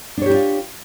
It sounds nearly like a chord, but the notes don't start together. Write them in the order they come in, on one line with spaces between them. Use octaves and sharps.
D4 C#5 G4 D#4 F4